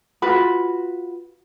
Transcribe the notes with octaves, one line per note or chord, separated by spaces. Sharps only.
F4 F#4 B4 B5